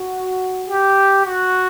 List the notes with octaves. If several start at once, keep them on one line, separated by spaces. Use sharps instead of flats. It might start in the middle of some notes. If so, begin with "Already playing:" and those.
Already playing: F#4
G4
F#4